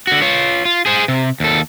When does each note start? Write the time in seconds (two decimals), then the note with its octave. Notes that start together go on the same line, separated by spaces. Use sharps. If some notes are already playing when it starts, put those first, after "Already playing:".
0.07 D3 F#4
0.22 F4 C#5
0.65 F4
0.86 G#4 C5
1.08 C3
1.40 D#2 A4